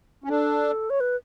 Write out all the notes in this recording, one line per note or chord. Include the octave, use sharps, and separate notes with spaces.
C#4
D4 A4
C#5
B4